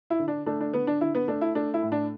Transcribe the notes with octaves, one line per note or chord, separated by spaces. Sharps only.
E4
D3
D4
A3 D4
D4
D3 B3
D4
D3 E4
B3
A3 D4
E4
A3 D4
E4
A2
D4